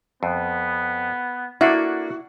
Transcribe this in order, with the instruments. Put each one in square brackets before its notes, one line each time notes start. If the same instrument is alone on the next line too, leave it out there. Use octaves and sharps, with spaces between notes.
[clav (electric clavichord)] F2 [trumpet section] B3
[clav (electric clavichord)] A#3 D4 A4 [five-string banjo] E4 [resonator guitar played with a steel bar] F#4